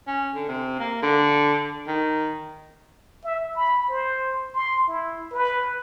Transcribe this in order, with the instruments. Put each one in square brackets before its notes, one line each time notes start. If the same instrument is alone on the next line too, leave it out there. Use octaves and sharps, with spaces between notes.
[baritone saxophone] C#4
D3
C3
A#3
D3
D#3
[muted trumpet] E5
B5
C5
C6
E4
B4